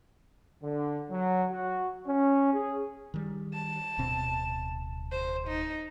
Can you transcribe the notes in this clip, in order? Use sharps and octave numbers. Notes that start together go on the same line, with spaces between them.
D3
F#3
F#4
C#4
G#4
D#3 G3
A5
D1 B2 C4
C5
D#4